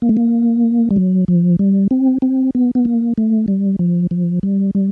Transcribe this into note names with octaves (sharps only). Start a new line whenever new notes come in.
A#3
A3
A#3
G3
F#3
F3
G3
C4
C4
B3
B3
A#3
A3
G3
F3
F3
G3
G3